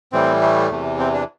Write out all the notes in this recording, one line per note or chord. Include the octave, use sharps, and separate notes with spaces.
A2 E3 G3 C4
A3
E2 C3 E3
C4
D4